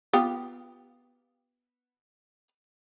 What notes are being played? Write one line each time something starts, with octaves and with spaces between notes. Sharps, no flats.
B3 F4 G4